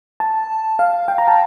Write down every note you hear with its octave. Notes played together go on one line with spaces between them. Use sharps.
A5
F5
G5
A#5
A5